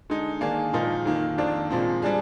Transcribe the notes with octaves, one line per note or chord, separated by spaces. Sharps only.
D3 G#3 D#4
D#3 A#3 D4 G#4
A#2 F3 G#3 D#4 A#4
F2 D#3 A#3
F2 D#3 A#3 D4
A#2 F3 G#3 C4
G3 D4 G#4